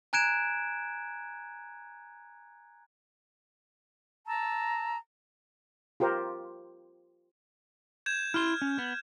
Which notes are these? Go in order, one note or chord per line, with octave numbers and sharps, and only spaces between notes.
G#5 A#5 F#6 G#6 D7 E7
A5 A#5 E6
F4 G4 A#4 C5
G6 G#6 E7
E4 C6 F6
C#4
B3